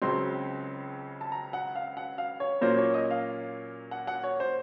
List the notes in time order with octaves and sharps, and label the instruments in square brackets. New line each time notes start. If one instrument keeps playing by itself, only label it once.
[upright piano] C#2 C#3 F#3 C4 C6
A5
A#5
F#5
F5
F#5
F5
C#5
A#2 F#3 A#3 C#4 F4 C5
C#5
D#5
F5
F#5
F#5
C#5
C5